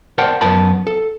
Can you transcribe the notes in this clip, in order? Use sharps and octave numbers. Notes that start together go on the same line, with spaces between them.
A#4 C5 D5 F#5 G5 A5
F#2 F3 B3 A#4 A5 B5
A4